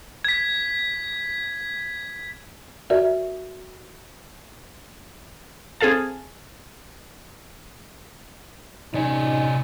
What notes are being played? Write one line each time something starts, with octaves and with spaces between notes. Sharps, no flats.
G#6 B6
F#4 A#4 D5 E5
C4 G#4 A4 F5 A5
G#2 C3 C#4 D#4 D5 G#5